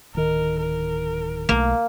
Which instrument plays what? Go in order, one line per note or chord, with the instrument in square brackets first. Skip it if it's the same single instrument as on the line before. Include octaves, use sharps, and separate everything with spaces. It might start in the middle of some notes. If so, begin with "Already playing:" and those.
[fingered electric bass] D1 D#3 [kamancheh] A#4
[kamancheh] A#4
[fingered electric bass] B1 A3 [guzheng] A#3